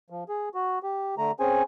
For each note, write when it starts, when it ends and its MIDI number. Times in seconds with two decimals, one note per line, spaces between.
0.10 0.24 53
0.29 0.49 68
0.54 0.79 66
0.83 1.15 67
1.18 1.32 50
1.18 1.32 57
1.18 1.32 82
1.40 1.63 60
1.40 1.63 61
1.40 1.63 68
1.40 1.63 72
1.40 1.63 80